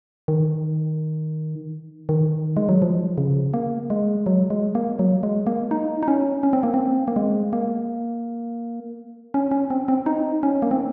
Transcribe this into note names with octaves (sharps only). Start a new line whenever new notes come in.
D#3
D#3
G#3
F#3
F3
C#3
A#3
G#3
F#3
G#3
A#3
F#3
G#3
A#3
D#4
D#4
C#4
C#4
C4
A#3
C4
A#3
G#3
A#3
C#4
C#4
C4
C4
D#4
C#4
A#3
C4